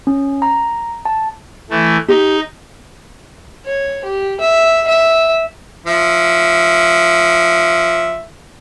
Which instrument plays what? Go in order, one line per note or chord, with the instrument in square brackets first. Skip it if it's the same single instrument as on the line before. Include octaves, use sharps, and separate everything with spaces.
[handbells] C#4
A#5
A5
[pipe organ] E3 A3
[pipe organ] D#4 [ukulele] G4
[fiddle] C#5
G4
E5
E5
[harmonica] F3 E5